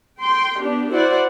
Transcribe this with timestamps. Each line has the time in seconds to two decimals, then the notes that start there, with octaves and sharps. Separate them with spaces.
0.21 G5 C6
0.61 B3 D4 G4
0.91 E4 F#4 C5 D5 F#5